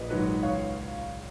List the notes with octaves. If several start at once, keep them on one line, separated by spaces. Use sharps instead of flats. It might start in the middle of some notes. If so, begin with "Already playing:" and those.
Already playing: A#1 B4 D#5
G#2 D#3 F#3 B4 D#5
C#2 C#5 F5